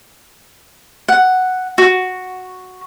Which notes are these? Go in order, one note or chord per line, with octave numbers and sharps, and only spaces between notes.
F#5
F#4